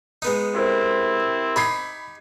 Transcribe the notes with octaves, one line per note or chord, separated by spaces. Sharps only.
G#3 B3 D#4
C4 E4 G4 A#4 C5
D#4 G4 B5 G#6 C7